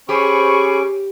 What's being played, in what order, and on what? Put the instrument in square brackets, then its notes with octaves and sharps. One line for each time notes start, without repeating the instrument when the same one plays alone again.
[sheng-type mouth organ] C#4 D6 [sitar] G4 [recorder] G#4 [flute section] C5 B5 C#6